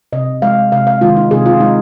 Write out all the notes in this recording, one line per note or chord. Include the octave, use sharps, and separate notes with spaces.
C3 D#5
G#3 F5
C3 F5
F5
D#3 G#3 F4
D#4
C3 G#4
F4
G#3 D#4